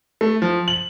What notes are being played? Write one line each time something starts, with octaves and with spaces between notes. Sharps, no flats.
A3
F3
F#7